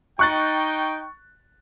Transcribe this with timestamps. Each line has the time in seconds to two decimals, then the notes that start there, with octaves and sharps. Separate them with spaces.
0.19 D#4 G5 C#6 F#6 A6